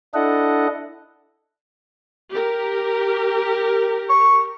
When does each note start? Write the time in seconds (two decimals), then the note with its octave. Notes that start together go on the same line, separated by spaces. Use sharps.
0.14 D4 E4 A4 D#5 F#5
2.30 G4 A#4
4.09 C#6